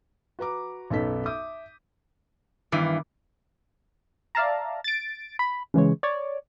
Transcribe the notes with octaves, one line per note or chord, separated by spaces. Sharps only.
F#4 B4 A#5 D6
B1 F#2 B3 D#4 A4 B6
E5 D6 D#6 G6
G2 D#3 E3 B3 D6
D5 E5 F5 A5 A#5
A6 D7
B5
C#3 E3 G#3 C#5
C#5 D5